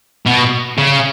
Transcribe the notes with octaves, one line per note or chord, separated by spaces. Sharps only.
B2
C#3